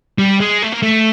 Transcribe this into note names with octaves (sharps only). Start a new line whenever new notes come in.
G3
G#3
A3
A#3
A3